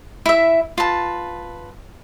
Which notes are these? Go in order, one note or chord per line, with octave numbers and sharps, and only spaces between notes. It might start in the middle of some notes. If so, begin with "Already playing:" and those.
E4 E5
F4 B4 A5